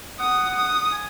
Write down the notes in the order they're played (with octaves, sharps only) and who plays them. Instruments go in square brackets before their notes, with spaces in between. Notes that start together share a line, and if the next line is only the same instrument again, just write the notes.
[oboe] F#5 [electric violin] D#6
[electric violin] D#6
[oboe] G#5